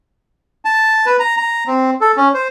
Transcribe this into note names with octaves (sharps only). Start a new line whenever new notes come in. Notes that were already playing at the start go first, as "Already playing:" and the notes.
A5
B4
A#5
A#5
C4
A4
C#4
C5